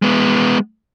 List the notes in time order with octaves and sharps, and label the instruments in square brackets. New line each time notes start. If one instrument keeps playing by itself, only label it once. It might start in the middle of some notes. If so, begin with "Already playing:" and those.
[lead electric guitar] G#3 B3